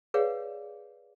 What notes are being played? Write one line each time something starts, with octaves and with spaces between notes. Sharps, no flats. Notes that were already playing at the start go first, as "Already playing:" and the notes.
G#4 B4 C#5 D5 F5 F#5